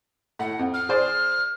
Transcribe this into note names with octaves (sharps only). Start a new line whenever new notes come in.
A2 F#5
F2
F6
G#4 C5 D5